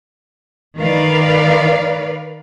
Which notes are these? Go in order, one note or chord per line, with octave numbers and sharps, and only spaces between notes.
D#3 A#4 B4 D5 F5